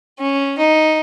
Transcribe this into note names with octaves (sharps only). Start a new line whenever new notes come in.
C#4
D#4